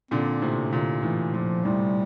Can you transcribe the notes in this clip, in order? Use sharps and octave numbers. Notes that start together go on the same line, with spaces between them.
A#2 D3 C4
A2 C3 A#3
A#2 D3
A2 E3
A#2 F3
A2 C3 G3